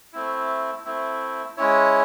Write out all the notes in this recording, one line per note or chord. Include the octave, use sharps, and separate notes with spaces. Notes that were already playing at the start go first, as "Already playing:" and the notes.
A3 C4 E4
A3 C4 E4
G#3 C#4 E4 C#5